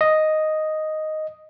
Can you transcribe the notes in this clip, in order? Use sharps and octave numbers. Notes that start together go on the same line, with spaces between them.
D#5